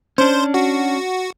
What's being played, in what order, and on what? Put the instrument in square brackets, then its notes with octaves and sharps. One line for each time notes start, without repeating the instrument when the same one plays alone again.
[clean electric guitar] C#4 D4 [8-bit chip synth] C5
[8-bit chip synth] F#4